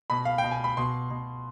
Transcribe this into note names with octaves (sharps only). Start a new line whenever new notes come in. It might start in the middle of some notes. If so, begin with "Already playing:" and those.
B2 B5
F5
G5
B2
G#5
B5
B2 C6
B2